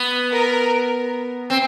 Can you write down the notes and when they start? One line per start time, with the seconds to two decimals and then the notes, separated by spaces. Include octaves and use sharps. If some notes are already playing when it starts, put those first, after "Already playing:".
Already playing: B3
0.32 A#4
1.50 C4